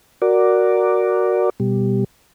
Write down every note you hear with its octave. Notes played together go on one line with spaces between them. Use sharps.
F#4 A#4 D5
B2 G3